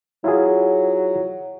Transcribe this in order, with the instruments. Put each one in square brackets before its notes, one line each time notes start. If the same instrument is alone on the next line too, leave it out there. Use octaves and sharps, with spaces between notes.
[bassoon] F#3 [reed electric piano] E4 F4 G#4